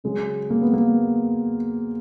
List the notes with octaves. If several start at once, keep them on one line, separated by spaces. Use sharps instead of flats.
C#3 F#3 G#3
A#3
B3
A#3